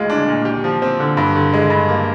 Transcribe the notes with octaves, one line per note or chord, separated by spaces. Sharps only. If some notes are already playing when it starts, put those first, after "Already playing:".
Already playing: D2 G#3 F4
D4
A#2
G4
F3
C4
D3
G2
D3
G#3
G2
A#3